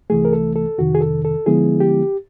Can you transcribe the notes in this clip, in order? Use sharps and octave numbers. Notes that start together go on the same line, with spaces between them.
C2 C3 E3 A3 G#4
A#4
A4
A4
F2 C3 D#3 F#4
G#4
A4
A4
D3 F3 G#3 B3 E4 G#4
G4